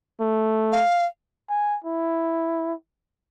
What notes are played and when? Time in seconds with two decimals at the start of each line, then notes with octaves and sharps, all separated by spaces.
0.20 A3
0.72 F5
1.49 G#5
1.84 E4